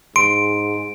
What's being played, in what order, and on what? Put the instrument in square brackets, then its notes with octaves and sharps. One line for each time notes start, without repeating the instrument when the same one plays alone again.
[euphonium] G#2 [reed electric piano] C6 [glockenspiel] D7